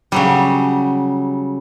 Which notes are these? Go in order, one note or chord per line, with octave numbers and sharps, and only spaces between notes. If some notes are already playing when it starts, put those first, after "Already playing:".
C#3 F#3 G3